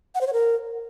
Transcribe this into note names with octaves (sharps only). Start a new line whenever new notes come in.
F#5
C5
C#5
A#4